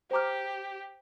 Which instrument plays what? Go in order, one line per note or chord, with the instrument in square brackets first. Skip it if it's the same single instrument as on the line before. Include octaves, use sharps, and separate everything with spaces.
[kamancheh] G4 [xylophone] C5 A#5 D6 F6